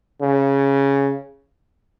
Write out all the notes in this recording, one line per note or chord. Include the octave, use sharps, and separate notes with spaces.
C#3